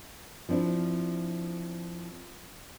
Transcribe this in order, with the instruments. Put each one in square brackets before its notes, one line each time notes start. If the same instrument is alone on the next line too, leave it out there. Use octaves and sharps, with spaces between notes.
[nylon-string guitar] F3 C4 D4 E4